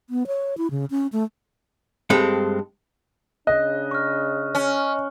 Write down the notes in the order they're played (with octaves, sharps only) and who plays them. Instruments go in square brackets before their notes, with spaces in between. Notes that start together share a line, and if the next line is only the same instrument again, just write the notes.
[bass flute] B3
C#5
E4
C#3
C#4
A3
[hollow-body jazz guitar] G2 G#3 C4 A4
[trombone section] C#3 D4 [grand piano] D#5 [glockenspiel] F#6
[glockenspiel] C#6 F6
[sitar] C#4